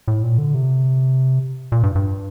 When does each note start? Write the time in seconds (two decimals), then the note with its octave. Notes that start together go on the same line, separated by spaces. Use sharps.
0.08 A2
0.23 A#2
0.38 D3
0.54 C3
1.72 A#2
1.83 G2
1.95 G2